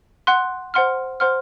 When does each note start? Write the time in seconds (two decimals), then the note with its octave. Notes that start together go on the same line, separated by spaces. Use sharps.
0.27 F#5 C6 F#6
0.74 C5 F#5 C6 F6
1.20 C5 F#5 C6 F6